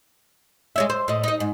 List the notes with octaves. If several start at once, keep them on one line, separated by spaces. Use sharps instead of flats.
G#3 C#5 E5
C5
A2 D#5
D#4 D#5
G#2